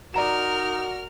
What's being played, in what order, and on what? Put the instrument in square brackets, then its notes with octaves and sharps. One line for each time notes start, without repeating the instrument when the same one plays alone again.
[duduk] D#4 [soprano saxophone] F#4 [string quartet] A#4 F6 [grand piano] D5 A#5 E7